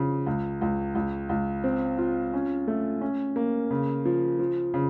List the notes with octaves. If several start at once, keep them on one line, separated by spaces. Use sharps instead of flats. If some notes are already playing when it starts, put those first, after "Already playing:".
Already playing: C#3 F3
C#2
C#2
C#2
C#2
C4
F4
C#4
A3
C#4
A#3
C#3
F3
F3
C#3